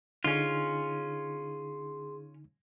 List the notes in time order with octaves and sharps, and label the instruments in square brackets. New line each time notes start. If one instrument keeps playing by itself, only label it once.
[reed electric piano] D3 D#4 [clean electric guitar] C#4 F4 [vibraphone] G#4 C6